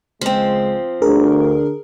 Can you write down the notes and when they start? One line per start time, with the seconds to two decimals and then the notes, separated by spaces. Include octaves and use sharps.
0.21 C#2 F3 G#3 C4
1.02 D2 D3 D4 G#4 A#4